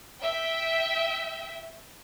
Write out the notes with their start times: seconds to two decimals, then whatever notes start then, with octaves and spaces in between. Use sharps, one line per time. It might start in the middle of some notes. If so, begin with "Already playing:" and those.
0.22 E5 G5